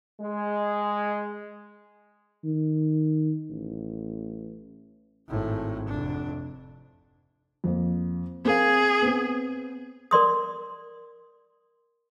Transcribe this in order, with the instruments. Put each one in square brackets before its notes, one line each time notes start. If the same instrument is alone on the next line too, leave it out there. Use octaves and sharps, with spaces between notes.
[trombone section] G#3
[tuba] D#3
A1
[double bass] G#1 A2
F1 D4
[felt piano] F2 A#3
[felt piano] C4 A#4 F5 [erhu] G#4
[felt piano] B3 C4
[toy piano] A#4 D5 C6 D#6